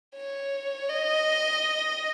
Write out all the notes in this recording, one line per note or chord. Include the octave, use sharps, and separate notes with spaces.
C#5
D#5